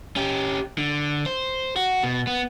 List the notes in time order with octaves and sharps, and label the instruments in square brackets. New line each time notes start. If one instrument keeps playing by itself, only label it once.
[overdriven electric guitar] C#4 G4
D3
C5
F#4
B2
B3